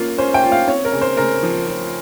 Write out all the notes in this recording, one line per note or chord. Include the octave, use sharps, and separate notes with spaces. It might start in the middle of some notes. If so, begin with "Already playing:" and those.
Already playing: A#3 C#4 F4
C#4 C5
G5
F4
F5
C4 C#5
A#4
C#3
C5
C#3 A#4
F3
F3